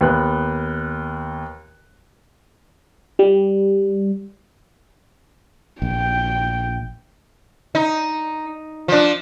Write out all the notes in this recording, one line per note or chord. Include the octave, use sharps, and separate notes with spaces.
D#2 B3 F#6
G3
A#1 G5
D#4
F3 D4